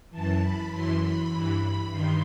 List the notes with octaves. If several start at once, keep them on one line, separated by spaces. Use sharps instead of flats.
F#2 E3 A5
B5
F#2 E3 C6
B5
G2 E3
B5
G2 D#3 C6